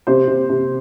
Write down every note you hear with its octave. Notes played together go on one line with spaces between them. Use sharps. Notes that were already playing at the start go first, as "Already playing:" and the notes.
C3 C5
C3
C3